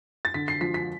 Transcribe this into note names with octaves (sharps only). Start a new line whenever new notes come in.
A6
D3 B6
C7
F3 B6
B6